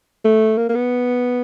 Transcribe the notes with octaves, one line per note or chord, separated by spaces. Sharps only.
A3
A#3
A#3
B3